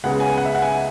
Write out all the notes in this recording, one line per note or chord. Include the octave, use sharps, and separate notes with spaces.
C#2 C#3 G#3 B3 F#5
G#5
F#5
E5
F#5
G#5